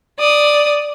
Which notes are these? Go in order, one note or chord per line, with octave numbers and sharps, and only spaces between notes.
D5 D#6